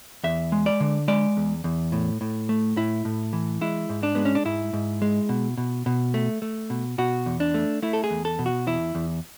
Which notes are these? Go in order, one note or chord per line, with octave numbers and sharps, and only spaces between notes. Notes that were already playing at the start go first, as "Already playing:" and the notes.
E2 E5
G#3
D5
D3
G#3 D5
E2
E2
A2
A2
A3
A2 E4
A2
E3
G#3 E4
G#2
D4
G#3 B3
C#4
D4
G#2 E4
G#2
G#3
B2
B2
B2
A3
A3
B2
B2 F#4
E2
D4
A3
A3 E4
A4
G#4
E2
A4
B2
F#4
E2 E4
E2